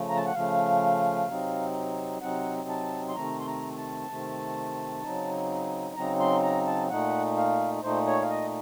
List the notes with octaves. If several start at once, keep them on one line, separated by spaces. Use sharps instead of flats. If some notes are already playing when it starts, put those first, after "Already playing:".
Already playing: C#3 F3 A3
A#5
A5
F#5
C#3 F3 A3 F5
C3 F#3 C4 D#4
C3 F#3 C4 D#4 F#5
A5
C6
C3 D#3 A3 C4 A#5
C6
A#5
A5
C3 D#3 A3 C4
C#3 F#3 C4 D#4
C#3 F#3 C4 D#4 A#5
C6
A#5
A5
A#2 A3 D#4 F#5
F5
A#2 A3 D#4 C5
C#5
F5
D#5